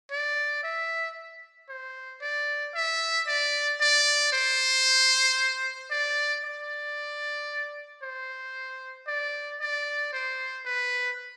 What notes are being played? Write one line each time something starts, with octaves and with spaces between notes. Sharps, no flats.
D5
E5
C5
D5
E5
D5
D5
C5
D5
D5
C5
D5
D5
C5
B4